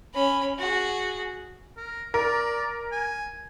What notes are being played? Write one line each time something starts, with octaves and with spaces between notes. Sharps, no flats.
C#4 B5
F#4 G#4
A#4
A#4 D5
G#5